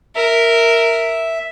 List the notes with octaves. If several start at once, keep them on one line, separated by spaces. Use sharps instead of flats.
A#4 E5